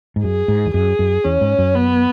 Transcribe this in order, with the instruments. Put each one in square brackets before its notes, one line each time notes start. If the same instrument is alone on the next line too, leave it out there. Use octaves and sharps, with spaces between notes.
[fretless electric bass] G#2
[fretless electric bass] F#2 [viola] G#4
[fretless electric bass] G#2
E2
[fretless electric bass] F#2 [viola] G#4
[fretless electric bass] F#2
[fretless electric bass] E2 [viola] C#4
[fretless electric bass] G#2
F#2
[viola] B3